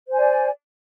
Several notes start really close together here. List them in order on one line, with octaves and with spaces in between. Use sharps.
C5 G#5 D5